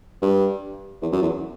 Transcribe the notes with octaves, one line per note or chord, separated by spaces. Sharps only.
G2
E2
F#2
E2